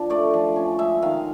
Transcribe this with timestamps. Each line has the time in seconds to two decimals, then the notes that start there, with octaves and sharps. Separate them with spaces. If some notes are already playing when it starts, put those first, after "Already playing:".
Already playing: F3 D4
0.10 A3 D5
0.34 F3
0.56 C#4
0.79 G#3 E5
1.02 D#3 F5